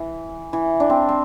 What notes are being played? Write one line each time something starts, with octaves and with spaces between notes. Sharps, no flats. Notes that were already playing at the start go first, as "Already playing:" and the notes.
Already playing: E3
E3
D4
C4
C4